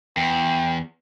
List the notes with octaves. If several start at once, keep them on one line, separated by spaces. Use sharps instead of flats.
E2 G5